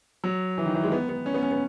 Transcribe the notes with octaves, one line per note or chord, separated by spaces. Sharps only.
F#3
E3
D#3
E3
G#3
B3
B3
C#4
B3
C#4
B3